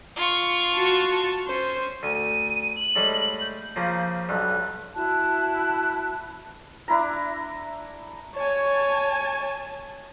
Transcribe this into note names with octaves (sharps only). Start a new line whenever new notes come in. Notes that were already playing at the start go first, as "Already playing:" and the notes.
F4 C#6
F#4 A5
C#4 C5
D2 D#7
F#7
A2 G3 G#3
G6
C#3 F3 A#3
B1 G2 F#6
E4 F#4 A5 F#6
D4 E4 A#5
C#5 G#5 A5